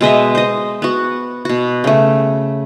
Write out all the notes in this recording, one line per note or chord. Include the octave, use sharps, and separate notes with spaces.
B2 G#3 D#5 E5
C5 D#5
B3 F#4
B2 F#4
C#3 A3